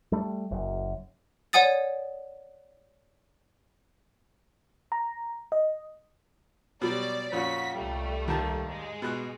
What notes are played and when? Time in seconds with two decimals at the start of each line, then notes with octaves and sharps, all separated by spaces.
0.12 G3 A3
0.51 F#1 F#2
1.53 C#5 D5 F#5 G#5 D#6 A6
4.92 A#5
5.52 D#5
6.81 B2 F#3 G3 D5
7.32 F2 A#2 C#4 F#4 B6
7.75 C2 G3 A3
8.28 D#2 D#3 A5
8.66 G#2 G#3
9.02 B2 F#6